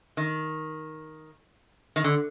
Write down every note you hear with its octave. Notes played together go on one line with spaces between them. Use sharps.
D#3
D#3
D3